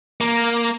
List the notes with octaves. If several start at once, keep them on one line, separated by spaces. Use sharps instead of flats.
A#3